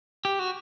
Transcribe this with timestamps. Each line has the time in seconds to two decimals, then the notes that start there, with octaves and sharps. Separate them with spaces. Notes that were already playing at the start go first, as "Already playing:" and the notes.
0.25 G4
0.39 F#4